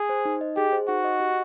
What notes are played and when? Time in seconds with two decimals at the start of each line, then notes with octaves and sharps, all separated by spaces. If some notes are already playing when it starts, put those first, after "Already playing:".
Already playing: G#4
0.09 C5
0.25 D#4
0.41 D#5
0.56 G4 G#4
0.72 C5
0.88 D#4 F#4
1.04 D#5
1.20 G4